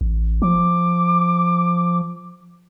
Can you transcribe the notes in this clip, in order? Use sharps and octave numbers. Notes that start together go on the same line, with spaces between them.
A1
F3 D6